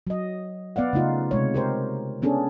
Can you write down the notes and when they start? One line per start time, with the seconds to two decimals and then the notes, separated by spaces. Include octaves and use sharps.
0.07 F#3 D#5
0.76 B3 D5 F5 F#5
0.93 C#3 A3 D#4 F4
1.31 C3 G#3 C#5
1.54 G4 A#4 C5
2.22 B3 C#4 D4 G#4 A4